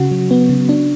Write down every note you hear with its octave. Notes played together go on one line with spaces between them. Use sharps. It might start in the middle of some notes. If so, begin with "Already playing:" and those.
Already playing: C#3 F#4
F#3
B3
C#3
D4